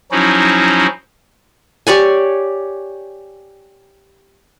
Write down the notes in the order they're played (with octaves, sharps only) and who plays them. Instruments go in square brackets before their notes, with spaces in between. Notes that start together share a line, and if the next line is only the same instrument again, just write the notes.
[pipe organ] F3 F#3 C#4 D#4 E4 F#4
[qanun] G4 C#5 D5 G#5